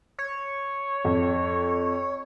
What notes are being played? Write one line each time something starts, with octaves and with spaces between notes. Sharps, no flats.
C#5
F2